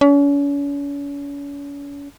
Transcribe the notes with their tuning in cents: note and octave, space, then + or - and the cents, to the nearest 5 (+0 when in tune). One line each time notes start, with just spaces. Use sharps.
C#4 +40